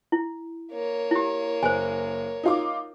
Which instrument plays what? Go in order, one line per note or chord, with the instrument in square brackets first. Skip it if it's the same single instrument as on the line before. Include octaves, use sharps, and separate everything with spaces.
[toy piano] E4
[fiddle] A#3 C#5
[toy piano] E4 G4
[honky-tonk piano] F#1 [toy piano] C5 G#5
[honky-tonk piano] D#4 F4 D6